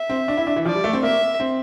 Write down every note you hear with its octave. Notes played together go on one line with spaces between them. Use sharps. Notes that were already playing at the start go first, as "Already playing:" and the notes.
Already playing: E5
C4
D4
E4
D4
E3
F3 D5
G3
A3
C4
A#3 E5
C4